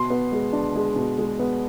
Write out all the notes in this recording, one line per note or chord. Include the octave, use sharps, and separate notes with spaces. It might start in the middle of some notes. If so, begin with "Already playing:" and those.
Already playing: B2 C6
B3
G#3
D4
G#3
B2
G#3
B3